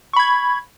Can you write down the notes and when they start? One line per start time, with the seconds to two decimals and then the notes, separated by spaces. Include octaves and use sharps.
0.13 C#6
0.16 B5
0.19 G#6